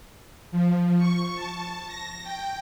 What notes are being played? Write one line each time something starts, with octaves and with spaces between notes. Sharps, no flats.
F3
C#6
A5
A#6
G5